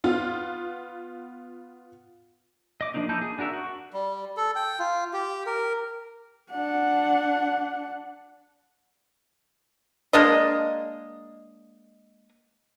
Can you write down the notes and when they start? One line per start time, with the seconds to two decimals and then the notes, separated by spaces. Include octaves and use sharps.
0.04 B3 F4
2.81 D#5 D6
2.94 F3 A#3 D4 D#4
3.09 A#3 D#4 E4 A5 G6
3.21 G#4
3.39 D4 F#4 A#4 E5
3.53 F#4
3.93 G3
4.37 A4
4.55 G5
4.79 F4
5.13 G4
5.46 A#4
6.50 D4 F#5
10.13 G#3 A#3 D4 D#5